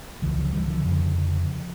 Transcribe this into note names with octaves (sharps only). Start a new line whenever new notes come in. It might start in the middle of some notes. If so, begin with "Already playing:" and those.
C#2 C#3 E3
D3 F3
E3 G3
D3 F3
F2 C#3